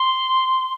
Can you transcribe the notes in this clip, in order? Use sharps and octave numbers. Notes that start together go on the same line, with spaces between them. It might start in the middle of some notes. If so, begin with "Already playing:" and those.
Already playing: C6